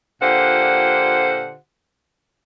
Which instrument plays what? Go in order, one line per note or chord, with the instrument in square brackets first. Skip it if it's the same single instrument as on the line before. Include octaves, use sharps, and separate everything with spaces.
[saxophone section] A#2 D3 F4 G4 C5 F#5